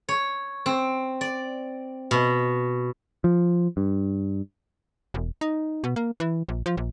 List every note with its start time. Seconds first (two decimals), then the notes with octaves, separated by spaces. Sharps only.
0.09 C#5
0.66 C4
1.21 D5
2.11 B2
3.24 F3
3.77 G2
5.14 E1
5.41 D#4
5.84 B2
5.96 A#3
6.20 E3
6.49 A#1
6.66 F3
6.77 A#1